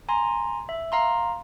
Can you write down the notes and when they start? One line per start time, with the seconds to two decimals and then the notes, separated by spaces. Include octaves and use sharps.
0.09 G#5 A#5 C6
0.69 E5
0.92 F5 A#5 C6